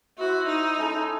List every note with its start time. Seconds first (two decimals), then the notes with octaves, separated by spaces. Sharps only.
0.19 E4 F#4 C5 E5
0.48 D#4
0.77 G#3 C#4 E4 A4